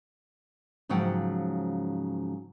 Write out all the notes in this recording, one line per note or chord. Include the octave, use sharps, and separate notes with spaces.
G#2 C#3 F3 F#3 F#5 G5